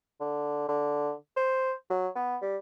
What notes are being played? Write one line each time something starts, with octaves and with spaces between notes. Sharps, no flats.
D3
D3
C5
F#3
B3
G3